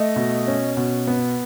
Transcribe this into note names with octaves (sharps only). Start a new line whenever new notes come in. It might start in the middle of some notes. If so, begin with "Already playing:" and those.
Already playing: A3 D#5
B2
C#4
B2
B3